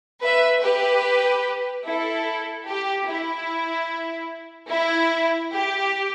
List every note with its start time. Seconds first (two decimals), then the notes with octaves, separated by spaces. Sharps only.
0.22 B4 E5
0.62 G4 B4
1.85 E4 A4
2.67 G4
3.07 E4
4.70 E4
5.53 G4